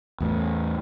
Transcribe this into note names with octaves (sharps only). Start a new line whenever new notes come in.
E2 A2